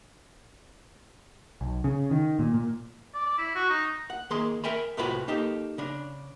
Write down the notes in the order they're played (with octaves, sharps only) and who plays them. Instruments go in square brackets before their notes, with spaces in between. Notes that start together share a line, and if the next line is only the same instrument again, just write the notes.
[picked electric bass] B1
C#3
D#3
A#2
A#2
[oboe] D5
D5
E4
F#4
D#4
[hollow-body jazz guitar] F#5
D#3 A#3 G#4 C6
A#4 E5 G5 G#5 B5
C2 A2 F4 F#4 B4 B5
A#3 D#4 G4 A4
C#3 D4